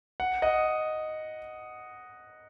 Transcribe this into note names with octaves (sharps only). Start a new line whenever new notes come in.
F#5
D#5 F#5